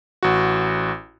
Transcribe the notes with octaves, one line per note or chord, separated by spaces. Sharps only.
A1 F#4